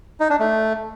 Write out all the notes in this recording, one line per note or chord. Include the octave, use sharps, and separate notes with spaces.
D#4
D4
A3